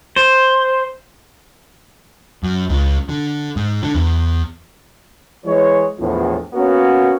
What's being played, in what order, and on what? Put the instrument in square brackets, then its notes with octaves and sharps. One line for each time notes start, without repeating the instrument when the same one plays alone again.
[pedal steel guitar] C5
[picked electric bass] F#2
C#2
D3
G#2
D3
E2
[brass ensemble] E3 G#3 C#5
A#1 E2 A2
A#3 B3 C#4 F#4 A#4 C#5